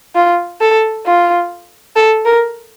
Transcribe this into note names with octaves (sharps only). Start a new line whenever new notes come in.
F4
A4
F4
A4
A#4